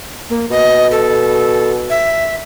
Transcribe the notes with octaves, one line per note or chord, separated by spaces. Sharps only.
A#3
B2 D#5
A4
E5